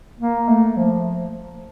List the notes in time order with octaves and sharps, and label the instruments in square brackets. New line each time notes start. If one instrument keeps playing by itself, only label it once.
[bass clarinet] A#3
A3
F3